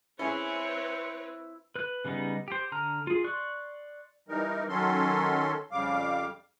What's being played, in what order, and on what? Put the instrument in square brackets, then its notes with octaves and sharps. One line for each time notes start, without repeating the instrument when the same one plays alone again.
[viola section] C4 B4 C#5 [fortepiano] C#4 G#4 [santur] E4 [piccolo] C#7
[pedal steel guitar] B4 F#6
C#3 G3 B3 D#4
G4 C5
D3 A#5 F6
F4 G#4
D5 C6 C#6 F#6
[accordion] E3 G3 D#4 A#4
D#3 F#3 C#4 A4 C6
F2 C#3 G3 F5 D6